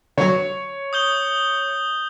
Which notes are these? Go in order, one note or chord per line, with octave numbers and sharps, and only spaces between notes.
D3 F#3 C#5
D#6 G6 G7